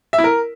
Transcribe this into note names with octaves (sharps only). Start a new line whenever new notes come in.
E5
E4
A#4